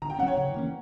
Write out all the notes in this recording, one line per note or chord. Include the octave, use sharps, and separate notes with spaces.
D3 A#5
G5
F#3 C#4 F#5
C#5
C#3
E3 A#3 C#4